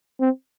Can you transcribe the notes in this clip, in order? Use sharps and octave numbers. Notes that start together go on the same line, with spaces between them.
C4